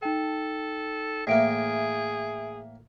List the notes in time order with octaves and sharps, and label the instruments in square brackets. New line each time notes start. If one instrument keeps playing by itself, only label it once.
[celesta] D#4 G5 [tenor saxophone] A4
[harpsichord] A2 E3 A#3 [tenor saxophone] G#4 [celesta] E5 D7